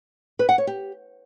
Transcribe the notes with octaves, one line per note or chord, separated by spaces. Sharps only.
B4
F#5
C#5
G4